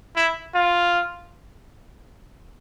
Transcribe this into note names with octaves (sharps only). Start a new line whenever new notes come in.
E4
F4